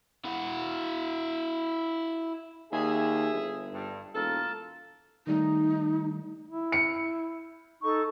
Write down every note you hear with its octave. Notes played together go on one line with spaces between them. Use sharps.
E4 F#4
D#2 G#4 E5
G1
G2
E1 A#3 F4 A4
D#3 G3 A3 D#4
E4
C#7
D#4 A4 C#6